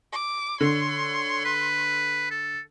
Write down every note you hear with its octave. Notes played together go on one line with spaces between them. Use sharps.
D6
D3 C#5 C6
B4
A4